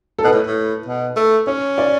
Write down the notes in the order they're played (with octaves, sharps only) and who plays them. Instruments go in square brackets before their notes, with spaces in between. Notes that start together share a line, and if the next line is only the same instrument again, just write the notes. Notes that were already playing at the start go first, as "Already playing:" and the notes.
[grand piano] A4
[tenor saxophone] B2 [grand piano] B4
[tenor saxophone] A2
A2
B2
A3
[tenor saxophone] C#4 [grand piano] C#5
[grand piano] D5